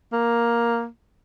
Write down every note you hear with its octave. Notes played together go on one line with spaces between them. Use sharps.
A#3